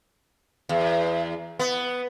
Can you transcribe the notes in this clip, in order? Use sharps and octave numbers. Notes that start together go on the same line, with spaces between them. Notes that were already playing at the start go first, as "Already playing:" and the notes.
E2
B3